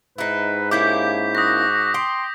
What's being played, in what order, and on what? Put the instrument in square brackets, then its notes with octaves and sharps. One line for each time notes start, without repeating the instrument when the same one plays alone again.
[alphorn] G#2 [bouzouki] D#4 E4 [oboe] B4
[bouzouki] A#3 C#4 E4 [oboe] G4 [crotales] D6 G6 B6
[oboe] F#4 [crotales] D#6 A#6
[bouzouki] G5 [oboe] C6